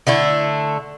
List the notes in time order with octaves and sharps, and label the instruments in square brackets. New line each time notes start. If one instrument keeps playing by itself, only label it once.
[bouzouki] D3 A3 E4